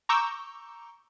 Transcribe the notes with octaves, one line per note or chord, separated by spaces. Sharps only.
A#5 C#6 D6 E6 G6